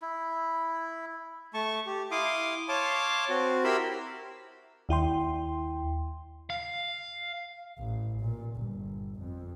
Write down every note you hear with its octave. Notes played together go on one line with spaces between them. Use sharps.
E4
A3 A5 C#6
G4
E4 F5 C6 D6 D#6
C#5 F5 A5 C6 D6
C4 F#4
E4 G4 A#4 B5 C6 E6
D#2 E4 G5 C6
F5
A1
A#2
G1
F2